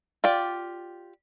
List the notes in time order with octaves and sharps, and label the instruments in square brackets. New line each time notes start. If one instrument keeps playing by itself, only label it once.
[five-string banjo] F4 G4 D5